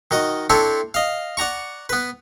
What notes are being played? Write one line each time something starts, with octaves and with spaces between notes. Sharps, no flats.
D#3 F#4 D#5
C4 D4 E4 A4 C#5
D#5 F5
D5 F#5 A#5 C#6
B3 B4